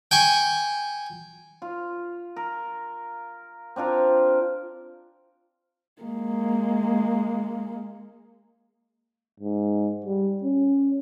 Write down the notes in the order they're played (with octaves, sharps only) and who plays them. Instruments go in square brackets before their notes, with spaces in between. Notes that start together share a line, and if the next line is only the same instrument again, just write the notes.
[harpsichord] G5 G#5 C#6
[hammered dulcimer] F4
A#4
C4 D4 F4 A#4
[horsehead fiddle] G#3 A#3
[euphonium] G#2
G3
C#4